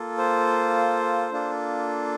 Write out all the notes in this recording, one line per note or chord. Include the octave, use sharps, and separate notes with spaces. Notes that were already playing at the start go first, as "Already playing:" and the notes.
Already playing: A#3 F4 A4
C5
A#3 D4 F4 A4